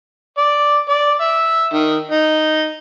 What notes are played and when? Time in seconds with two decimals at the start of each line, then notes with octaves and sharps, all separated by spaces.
0.38 D5
0.89 D5
1.21 E5
1.74 D#3
2.11 D#4